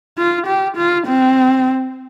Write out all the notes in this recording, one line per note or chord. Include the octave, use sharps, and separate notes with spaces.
F4
G4
F4
C4